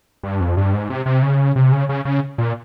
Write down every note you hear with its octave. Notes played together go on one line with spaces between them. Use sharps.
G2
F2
G2
G#2
C3
C3
C#3
C3
C#3
C#3
C#3
A#2